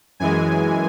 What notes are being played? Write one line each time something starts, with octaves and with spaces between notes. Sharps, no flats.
F#2 E3 G#3 G#5